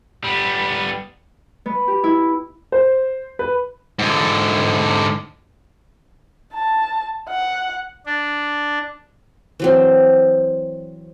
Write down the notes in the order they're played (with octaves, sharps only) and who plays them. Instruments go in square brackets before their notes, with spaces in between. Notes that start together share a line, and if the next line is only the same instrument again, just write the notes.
[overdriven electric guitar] G3 B3
[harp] B3
G4
E4
[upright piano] C5
B4
[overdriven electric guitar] G#2 D3
[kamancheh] A5
F#5
[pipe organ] D4
[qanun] E3 F#3 C4